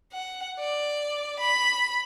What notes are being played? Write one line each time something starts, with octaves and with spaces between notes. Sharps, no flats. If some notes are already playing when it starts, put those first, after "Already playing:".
F#5
D5
B5